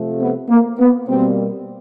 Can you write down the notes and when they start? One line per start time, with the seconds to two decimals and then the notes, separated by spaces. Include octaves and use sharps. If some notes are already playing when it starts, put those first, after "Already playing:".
Already playing: C3 F3 A3
0.20 B3
0.49 A#3
0.79 B3
1.07 B2 G3 A#3 C4